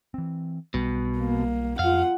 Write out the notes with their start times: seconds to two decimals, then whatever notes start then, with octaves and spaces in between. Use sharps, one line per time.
0.14 E3 C4
0.74 B1 B2 G3
1.18 A#3
1.79 F2 F4 F5 F#5